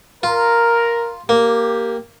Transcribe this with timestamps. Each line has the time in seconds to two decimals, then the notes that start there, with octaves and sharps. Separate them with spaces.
0.23 F4 A#4
1.29 A#3 G4